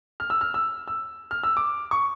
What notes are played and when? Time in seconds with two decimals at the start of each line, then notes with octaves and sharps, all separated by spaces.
0.20 F6
0.30 E6
0.41 F6
0.54 E6
0.88 E6
1.31 F6
1.43 E6
1.57 D6
1.91 C#6